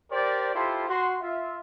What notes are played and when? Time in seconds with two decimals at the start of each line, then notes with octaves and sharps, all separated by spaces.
0.11 G4 A#4 C5 D5
0.54 E4 F4 G4 A4 C5
0.89 F#4 C6
1.22 F4 E5